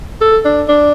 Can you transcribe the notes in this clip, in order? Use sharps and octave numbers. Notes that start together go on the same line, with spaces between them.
A4
D4
D4